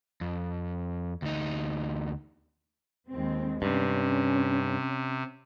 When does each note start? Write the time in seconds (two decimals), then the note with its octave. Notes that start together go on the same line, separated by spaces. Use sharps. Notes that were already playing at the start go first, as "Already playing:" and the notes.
0.21 F2
1.22 D2 D#4
3.10 D#2 G#3 C4
3.62 G2 C3 C#4